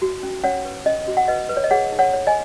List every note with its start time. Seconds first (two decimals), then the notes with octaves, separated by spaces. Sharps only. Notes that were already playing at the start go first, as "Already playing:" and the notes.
0.02 F#4
0.23 C#4
0.44 C#4 C#5 F#5
0.65 B4
0.86 C#4 D#5
1.07 F#4
1.17 F#5
1.28 B4 D#5
1.49 B4
1.57 C#5
1.64 D#5
1.71 G#4 C#5 F#5
1.92 D#4
1.99 C#5 F#5
2.13 C#5
2.27 D#5 G#5